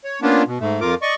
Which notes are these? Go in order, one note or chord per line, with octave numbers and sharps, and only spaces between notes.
C#5
A#3 B3 C#4 D4 F4
B2
G#2 A3
F2 F4 A#4 D6
D5 D#5 C#6